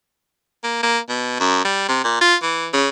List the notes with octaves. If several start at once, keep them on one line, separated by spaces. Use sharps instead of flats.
A#3
A#3
B2
F#2
G3
C3
A#2
F4
E3
C#3